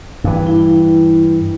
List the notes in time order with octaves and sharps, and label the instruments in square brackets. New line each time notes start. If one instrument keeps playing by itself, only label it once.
[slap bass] G2 E3
[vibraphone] E4